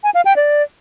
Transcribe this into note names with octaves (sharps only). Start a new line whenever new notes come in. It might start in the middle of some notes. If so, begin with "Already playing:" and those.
G#5
F5
G5
D5